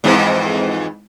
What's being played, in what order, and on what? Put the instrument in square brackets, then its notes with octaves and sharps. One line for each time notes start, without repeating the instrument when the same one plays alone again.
[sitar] F2 G#2 E3 [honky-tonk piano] G#3 C4 E4